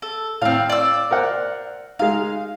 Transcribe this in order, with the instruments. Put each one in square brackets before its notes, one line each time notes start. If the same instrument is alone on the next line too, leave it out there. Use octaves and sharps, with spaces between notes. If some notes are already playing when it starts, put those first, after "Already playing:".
[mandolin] A4
[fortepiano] A2 [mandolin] C4 F5
[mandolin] D5 E6
[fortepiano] A#4 C5 F#5
[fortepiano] G#3 D#4 [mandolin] F5